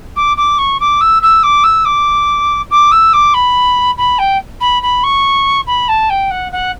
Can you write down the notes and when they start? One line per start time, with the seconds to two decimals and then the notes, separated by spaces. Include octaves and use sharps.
0.16 D6
0.37 D6
0.58 C#6
0.80 D6
1.01 E6
1.22 E6
1.43 D6
1.63 E6
1.85 D6
2.70 D6
2.91 E6
3.13 D6
3.34 B5
3.97 B5
4.18 G5
4.60 B5
4.82 B5
5.03 C#6
5.66 B5
5.88 A5
6.09 G5
6.30 F#5
6.52 F#5